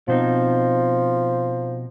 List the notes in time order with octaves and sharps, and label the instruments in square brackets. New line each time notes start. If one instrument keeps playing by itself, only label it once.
[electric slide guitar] B2 C4 D#4 [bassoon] F3